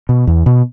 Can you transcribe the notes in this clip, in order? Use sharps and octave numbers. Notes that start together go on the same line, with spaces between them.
B2
E2
B2